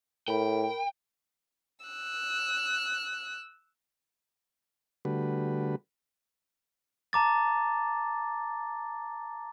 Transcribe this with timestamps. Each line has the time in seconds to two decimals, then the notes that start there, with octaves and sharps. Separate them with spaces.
0.28 A2 A#4 G5 B5
1.85 E6 F#6
5.05 D3 G3 A3 F#4 B4
7.13 A5 A#5 D6 A6